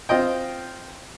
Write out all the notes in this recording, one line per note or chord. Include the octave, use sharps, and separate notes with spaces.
C4 F4 D#5 G5